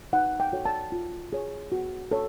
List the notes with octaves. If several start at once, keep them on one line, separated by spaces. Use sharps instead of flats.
D#4 F#5
G5
F#4 A4 C#5
A5
F4
G#4 C#5
F#4
A4 C#5